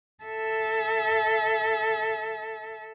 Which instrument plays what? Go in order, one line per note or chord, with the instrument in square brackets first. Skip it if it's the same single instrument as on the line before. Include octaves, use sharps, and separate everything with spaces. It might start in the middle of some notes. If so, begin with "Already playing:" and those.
[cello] A4 E5